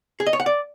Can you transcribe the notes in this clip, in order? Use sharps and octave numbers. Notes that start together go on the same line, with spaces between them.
G#4
D#5
C#5
F#5
D5